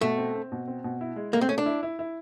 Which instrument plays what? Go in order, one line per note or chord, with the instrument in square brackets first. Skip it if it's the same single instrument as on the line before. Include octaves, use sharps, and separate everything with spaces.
[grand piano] B2 [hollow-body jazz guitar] A3
[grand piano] C4
C4
B2
C4
B2
E4
G#3
[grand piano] A3 [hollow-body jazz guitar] A#3
[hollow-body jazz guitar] C4
[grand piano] A3 [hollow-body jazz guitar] C#4
[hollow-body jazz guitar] D4
[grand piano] E4
E4
E4